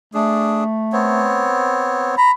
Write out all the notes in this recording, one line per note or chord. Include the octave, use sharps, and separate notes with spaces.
A3 D4 G#4
B3 C4 C#5
A#5 B5